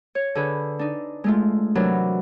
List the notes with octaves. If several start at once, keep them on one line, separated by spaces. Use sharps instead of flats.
C#5
D3 G#4 B4
D4 D#4
G#3 A3 F4
C3 E3 F#3 D4 A#4